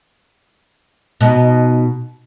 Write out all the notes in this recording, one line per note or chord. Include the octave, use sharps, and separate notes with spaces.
B2 D#4